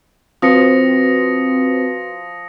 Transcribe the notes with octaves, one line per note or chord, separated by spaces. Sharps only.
F3 C4 F4 F#4 B4 D#6 A#6 C#7